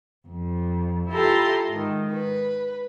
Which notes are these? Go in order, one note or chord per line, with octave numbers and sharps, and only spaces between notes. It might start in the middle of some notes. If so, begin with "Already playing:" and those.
F2
E4 F4 G4 A4 A#5 C6
G#2 D#3
B4